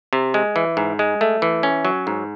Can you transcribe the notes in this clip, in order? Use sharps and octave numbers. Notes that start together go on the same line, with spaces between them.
C3
G#3
E3
G#2
G#3
A3
E3
C#4
F#3
G#2